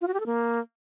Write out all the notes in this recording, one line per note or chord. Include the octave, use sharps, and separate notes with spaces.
F4
F#4
G4
A4
A#3